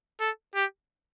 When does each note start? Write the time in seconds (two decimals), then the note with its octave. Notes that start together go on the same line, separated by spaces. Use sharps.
0.20 A4
0.55 G4